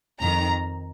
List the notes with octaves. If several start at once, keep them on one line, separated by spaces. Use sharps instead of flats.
F2 D#3 A#5